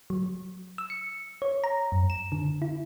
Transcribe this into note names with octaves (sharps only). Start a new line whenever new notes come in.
F#3
E6
C#7
C#5
A#5
F#2
E7
D3
E4